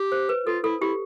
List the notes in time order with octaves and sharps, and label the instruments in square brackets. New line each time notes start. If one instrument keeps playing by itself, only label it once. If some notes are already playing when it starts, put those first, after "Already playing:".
Already playing: [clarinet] G4
[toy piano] C5
B4
[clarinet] F4 [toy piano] A4
[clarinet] E4 [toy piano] A4
[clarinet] E4 [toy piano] G4